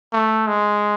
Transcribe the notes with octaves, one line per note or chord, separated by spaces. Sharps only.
A3
G#3